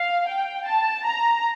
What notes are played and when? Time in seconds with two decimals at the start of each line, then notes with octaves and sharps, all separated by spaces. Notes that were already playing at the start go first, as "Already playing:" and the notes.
Already playing: F5
0.27 G5
0.67 A5
1.05 A#5